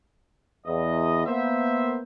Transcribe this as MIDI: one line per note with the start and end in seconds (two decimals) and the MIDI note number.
0.66 1.25 40
0.66 1.25 75
1.26 2.02 58
1.26 2.02 59
1.26 2.02 72
1.26 2.02 76